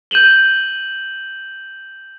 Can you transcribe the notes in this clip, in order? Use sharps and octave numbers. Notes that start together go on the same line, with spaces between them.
G6 D#7 E7 F#7 G7